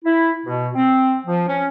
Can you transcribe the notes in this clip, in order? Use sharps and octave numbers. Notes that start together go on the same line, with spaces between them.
E4
B2
C4
F3
C#4